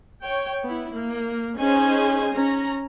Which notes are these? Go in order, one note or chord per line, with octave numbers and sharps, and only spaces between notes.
C#5 G5
B3 E4
A#3
C#4 D#4 G#4 C5 G#5
C#4 A#5